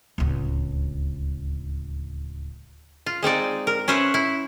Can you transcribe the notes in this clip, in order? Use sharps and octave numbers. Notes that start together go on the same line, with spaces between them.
D1 C#2
F4
G#3 C4 D#4 D5
A#4
C#4 B4 C5 E5 F#5
E4